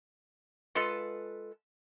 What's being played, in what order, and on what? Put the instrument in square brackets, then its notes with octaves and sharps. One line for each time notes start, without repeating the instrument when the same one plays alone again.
[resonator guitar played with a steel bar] G#3 F4 A4 B4